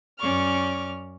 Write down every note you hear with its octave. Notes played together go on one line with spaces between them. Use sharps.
F#2 C#4 D5 C#6 D6 F6